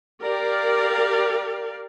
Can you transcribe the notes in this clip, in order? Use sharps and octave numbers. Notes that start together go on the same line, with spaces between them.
G4 A#4 D5 F5